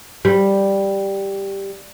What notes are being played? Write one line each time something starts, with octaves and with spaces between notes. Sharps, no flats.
G3